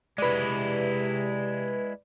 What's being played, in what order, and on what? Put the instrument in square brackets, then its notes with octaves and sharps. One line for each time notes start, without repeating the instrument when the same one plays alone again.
[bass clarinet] C3 [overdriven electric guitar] G#3 E4 [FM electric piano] B4 D5